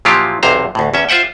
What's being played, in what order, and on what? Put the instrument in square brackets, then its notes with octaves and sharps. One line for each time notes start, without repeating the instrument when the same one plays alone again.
[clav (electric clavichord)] A#2 F3 F#3 E4 F4 G4
B1 E2 C3 C5 A#5
D2 A2
E2 C#4 E5
F4 C5 E5 F#5 G5